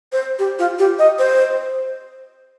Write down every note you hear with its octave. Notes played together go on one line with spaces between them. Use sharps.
C5
G4
F4
G4
D#5
C5